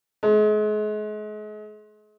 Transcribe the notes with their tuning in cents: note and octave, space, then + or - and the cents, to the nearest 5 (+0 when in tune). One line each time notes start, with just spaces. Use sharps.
G#3 +35